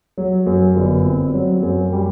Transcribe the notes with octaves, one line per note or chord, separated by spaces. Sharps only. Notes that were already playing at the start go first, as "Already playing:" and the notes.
F#3
F#2
G1
C4
F#3
F#2
G3